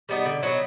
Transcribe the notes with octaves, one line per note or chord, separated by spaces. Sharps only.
G3 B3 D#4
D3
F#3 B3 D#4